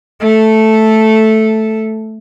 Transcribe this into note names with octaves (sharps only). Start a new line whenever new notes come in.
A3 A4